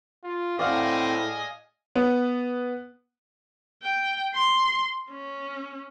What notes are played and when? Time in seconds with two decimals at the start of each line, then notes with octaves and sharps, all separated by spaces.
0.24 F4
0.59 A2 C4 D5 D#5 F5 F#5 G#5
1.96 B3
3.83 G5
4.35 C6
5.11 C#4